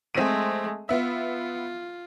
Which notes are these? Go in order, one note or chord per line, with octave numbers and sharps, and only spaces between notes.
G#3 A3 C4 D#7
B3 F4 E5